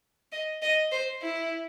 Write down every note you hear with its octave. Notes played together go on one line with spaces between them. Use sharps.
D#5
D#5
C5
E4